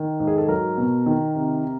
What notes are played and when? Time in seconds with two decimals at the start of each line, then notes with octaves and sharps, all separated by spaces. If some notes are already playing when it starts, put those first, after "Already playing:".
Already playing: D#3
0.20 G#2
0.27 G#4
0.38 A4
0.48 F#3 A#4
0.77 B2
1.06 D#3
1.35 C3